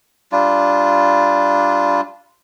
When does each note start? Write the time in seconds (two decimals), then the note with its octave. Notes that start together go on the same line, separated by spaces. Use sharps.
0.32 G3 D4 F4